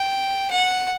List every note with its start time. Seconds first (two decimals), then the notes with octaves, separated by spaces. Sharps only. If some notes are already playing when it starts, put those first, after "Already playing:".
Already playing: G5
0.51 F#5